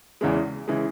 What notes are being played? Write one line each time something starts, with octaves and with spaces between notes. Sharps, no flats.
E2 C#3 E3 G#3
C#3 E3 G#3